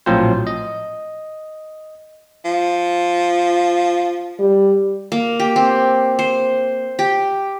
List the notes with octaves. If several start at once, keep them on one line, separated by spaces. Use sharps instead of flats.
A#1 A2 F3 F#3 C4 C5
D#5
F3
G3
A#3
G4
C4
C5
G4